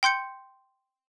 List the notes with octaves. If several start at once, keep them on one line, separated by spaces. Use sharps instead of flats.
G5 C6 G6 C#7